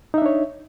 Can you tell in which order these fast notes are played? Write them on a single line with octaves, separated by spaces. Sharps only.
D#4 E5 D4 C#5